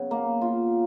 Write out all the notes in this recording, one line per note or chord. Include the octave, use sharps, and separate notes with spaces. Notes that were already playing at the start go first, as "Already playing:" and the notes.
Already playing: C#3 F#3 B3
A#3
F4